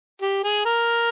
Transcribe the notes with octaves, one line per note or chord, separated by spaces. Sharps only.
G4
G#4
A#4